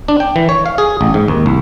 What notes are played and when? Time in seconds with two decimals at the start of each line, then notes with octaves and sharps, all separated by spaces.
0.08 D4
0.20 G5
0.36 E3
0.49 C#5
0.66 F5
0.78 G#4
1.01 A1
1.14 G#2
1.28 D#2
1.46 C2